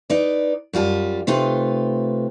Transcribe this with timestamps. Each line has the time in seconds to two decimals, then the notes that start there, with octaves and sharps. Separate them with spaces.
0.10 D#4 B4 D5
0.73 F#2 G3 F4 A5
1.27 C3 A3 D#4 F4 B4